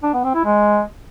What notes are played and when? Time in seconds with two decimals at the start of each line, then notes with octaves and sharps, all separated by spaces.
0.03 D4
0.14 B3
0.24 C4
0.35 E4
0.45 G#3